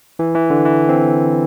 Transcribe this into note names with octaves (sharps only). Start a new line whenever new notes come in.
E3
E3
D3
E3
C4